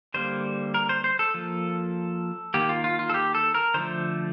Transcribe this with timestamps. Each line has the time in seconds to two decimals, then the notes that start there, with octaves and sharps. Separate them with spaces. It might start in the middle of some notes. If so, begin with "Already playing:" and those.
0.14 D3 G3 A#3 C5
0.74 A#4
0.89 C5
1.04 C5
1.19 A4
1.34 F3 A#3
2.54 D#3 A#3 G4
2.69 F4
2.84 F4
2.99 F4
3.09 A4
3.14 G4
3.35 A4
3.54 A#4
3.74 D3 F3 A3 C5